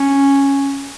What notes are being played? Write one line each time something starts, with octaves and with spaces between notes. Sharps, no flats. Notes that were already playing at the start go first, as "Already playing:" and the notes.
Already playing: C#4